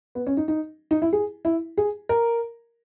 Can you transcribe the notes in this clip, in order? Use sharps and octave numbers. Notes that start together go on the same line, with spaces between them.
B3
C#4
D#4
D#4
D#4
E4
G#4
E4
G#4
A#4